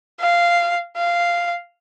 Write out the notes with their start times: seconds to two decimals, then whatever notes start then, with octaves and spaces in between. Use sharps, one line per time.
0.21 F5
0.97 F5